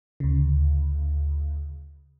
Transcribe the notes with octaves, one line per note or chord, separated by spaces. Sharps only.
D2 C#3